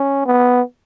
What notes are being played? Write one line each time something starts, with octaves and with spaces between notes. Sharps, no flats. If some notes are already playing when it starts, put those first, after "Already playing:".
Already playing: C#4
B3